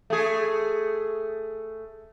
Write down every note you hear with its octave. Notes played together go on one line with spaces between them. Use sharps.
A3 G#4